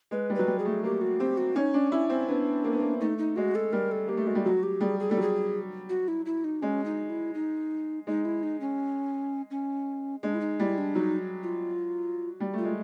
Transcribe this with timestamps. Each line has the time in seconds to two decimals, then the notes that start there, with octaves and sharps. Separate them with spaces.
0.11 G#3 B4
0.30 G3
0.35 F#3 B4
0.47 G3
0.59 G#4
0.65 A3
0.84 A#3 G4
1.01 F#4
1.20 C4 G4
1.37 F#4
1.56 C#4 D#4
1.74 C#4 D4
1.92 C#4 E4
2.10 C4 C#4
2.28 B3 D4
2.64 A#3
2.73 B3
2.81 A#3
3.01 A3 D#4
3.18 D#4
3.36 G#3 F#4
3.55 A4
3.73 G3 A#4
3.91 A4
4.08 A#3 G4
4.17 A3
4.26 G#3 F#4
4.35 G3
4.45 F#3 F#4
4.63 G4
4.81 G3 G#4
5.00 G#4
5.10 G3 A4
5.17 F#3 G#4
5.89 F#4
6.08 E4
6.26 E4
6.44 D#4
6.62 G#3 C#4
6.85 D#4
7.09 E4
7.34 D#4
8.07 G#3 D#4
8.25 E4
8.43 D#4
8.60 C#4
9.51 C#4
10.23 G#3 D4
10.34 E4
10.41 D#4
10.59 G3 E4
10.78 D4
10.95 F#3 D#4
11.43 F4
12.40 G3
12.53 A3 F4
12.64 G#3